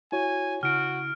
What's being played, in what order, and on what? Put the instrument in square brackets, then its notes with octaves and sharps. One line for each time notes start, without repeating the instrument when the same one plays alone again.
[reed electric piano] E4 F#4 C#5 [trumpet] G#5
[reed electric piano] C#3 E4 [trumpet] F#4 [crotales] F6 D7